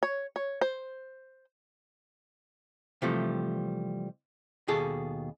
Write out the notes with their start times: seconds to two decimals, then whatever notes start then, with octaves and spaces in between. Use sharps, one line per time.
0.03 C#5
0.36 C#5
0.61 C5
3.02 C3 E3 F3 G3 A3
4.68 D#2 B2 G#4 A4